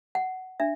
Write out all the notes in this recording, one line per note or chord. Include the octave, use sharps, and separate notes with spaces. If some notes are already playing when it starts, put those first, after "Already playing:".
F#5
D4 E5